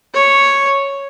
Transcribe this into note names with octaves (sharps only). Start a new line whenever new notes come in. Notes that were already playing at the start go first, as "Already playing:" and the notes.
C#5